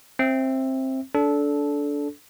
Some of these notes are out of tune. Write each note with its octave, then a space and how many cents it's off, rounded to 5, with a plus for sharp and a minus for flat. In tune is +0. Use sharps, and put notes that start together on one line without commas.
C4 +15 E5 +0
D4 -20 A4 -15